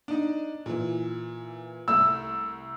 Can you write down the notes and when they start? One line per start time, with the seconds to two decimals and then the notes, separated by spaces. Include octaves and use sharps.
0.08 D4 D#4
0.66 A#2 E3
1.88 C2 A3 E6